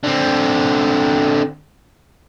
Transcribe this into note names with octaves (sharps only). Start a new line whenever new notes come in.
D3 C4